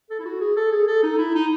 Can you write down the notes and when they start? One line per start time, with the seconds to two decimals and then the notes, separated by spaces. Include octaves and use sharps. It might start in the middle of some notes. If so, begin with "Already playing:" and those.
0.10 A4
0.19 E4
0.25 F#4
0.41 G#4
0.56 A4
0.72 G#4
0.87 A4
1.03 D#4
1.18 E4
1.34 D#4